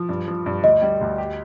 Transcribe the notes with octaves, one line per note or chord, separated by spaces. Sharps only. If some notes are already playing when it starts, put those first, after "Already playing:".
Already playing: F3
G2
F3
G2
D2 D#5
G3
D2
G4